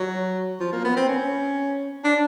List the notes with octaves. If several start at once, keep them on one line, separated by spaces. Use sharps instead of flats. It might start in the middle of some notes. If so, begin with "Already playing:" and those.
Already playing: F#3
F3
A#3
B3
C4
C#4
D4